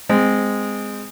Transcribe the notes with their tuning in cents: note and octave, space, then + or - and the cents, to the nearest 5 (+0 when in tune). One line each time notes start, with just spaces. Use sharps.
G#3 -10 C4 -20